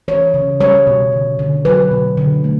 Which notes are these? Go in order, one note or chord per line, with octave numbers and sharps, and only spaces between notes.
E3 C#5
C#3
G3 C#5
B2
D3
D3
F#3 B4
B2
D3
A3